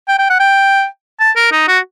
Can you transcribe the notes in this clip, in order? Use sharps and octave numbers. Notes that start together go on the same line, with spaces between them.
G5
G5
F#5
G5
A5
A#4
D#4
F#4